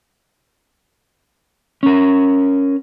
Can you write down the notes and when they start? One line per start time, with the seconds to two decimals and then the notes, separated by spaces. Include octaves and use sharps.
1.83 C#4 A#4